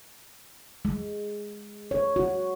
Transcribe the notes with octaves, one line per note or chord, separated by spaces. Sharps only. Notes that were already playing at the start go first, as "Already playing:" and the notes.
G#3
C#5
F#4